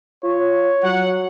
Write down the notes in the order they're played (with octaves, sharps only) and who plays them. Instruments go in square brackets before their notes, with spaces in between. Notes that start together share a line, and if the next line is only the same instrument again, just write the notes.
[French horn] F4 [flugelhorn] C#5
[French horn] F#3 [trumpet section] F#5